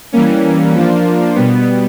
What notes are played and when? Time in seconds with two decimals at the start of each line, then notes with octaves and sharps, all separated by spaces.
0.12 E3 G3 A#3 C#4
0.75 F3 A#3 D4 F4
1.35 B2 G3 B3